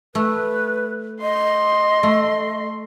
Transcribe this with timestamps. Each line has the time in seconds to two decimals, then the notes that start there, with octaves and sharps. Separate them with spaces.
0.15 A3 B4
1.22 D#5 C6
2.03 A3